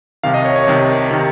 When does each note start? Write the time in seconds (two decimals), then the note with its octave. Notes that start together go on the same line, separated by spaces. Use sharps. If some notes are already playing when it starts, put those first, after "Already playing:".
0.23 C2 C3 D#3 F5
0.34 D#5
0.45 C#5
0.56 C#5
0.67 C2 C3 D#3
1.11 C3 D#3